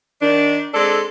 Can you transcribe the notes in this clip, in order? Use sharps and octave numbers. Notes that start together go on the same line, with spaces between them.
D#3 D4
G#3 C4 D4 A4